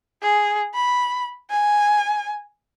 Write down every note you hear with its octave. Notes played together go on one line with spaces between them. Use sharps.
G#4
B5
G#5